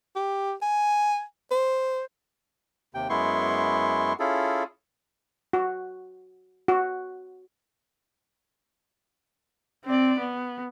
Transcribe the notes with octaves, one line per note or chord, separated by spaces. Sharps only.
G4
G#5
C5
D#2 C3 G5
F#2 G#3 B3 E4 C6 C#6
C#4 E4 F4 G#4 A4
F#4
F#4
C4 D5
B3